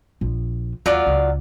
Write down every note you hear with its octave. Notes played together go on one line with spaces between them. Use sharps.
A#1
D#2 F#3 F4 D5
C#2